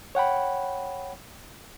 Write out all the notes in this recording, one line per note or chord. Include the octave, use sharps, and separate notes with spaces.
C#5 F#5 G5 B5